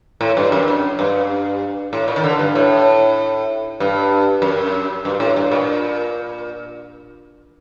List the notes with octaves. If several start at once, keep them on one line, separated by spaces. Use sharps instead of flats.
A2
G2
F#2
F#2
G2
A2
A#2
D#3
D3
G2
A2
G2
F#2
G2
A2
G2
A#2